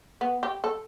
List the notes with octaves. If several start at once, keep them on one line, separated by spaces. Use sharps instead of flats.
B3
G4
A4